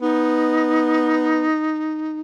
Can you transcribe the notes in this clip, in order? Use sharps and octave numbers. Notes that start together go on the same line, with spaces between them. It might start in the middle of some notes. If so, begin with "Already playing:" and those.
B3 D#4